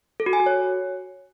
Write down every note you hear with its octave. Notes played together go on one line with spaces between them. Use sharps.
A4
F#4
G#5
F#4
C#5